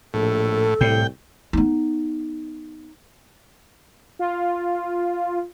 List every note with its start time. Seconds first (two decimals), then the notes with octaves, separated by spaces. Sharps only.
0.14 A#1 A2 A4
0.81 C2 A2 G5
1.53 B3 D#4
4.19 F4